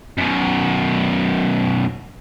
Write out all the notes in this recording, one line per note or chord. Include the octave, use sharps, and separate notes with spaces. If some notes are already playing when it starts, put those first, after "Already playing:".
F#2 B2